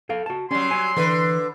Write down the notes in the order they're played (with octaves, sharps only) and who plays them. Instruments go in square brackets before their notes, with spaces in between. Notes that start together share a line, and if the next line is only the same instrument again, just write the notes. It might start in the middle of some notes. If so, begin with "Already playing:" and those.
[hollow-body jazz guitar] A4 F5
F#4 A5
[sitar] F#3 G3 [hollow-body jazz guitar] C#4 [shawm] C6
[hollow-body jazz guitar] C#5 G#5
[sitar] D3 B4 [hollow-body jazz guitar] E3